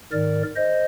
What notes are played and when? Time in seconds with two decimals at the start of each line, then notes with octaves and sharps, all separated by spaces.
0.12 G#2 D#3 A#4 D5
0.56 C5 D#5